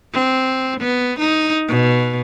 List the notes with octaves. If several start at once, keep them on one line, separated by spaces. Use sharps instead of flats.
C4
B3
D#4
B2